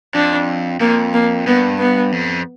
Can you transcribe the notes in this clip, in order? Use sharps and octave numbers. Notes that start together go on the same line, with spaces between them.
F2 D4
F2 A#3
A#3
G2 B3
B3
F2